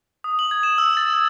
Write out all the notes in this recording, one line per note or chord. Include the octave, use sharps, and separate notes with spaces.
D#6
F#7
G#6
E7
E6
A6
G#6